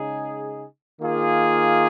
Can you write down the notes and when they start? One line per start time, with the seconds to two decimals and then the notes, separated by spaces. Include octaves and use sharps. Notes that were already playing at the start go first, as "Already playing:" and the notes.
Already playing: C#3 G#3 D#4 G#4
1.01 D#3 A#3 F4 G#4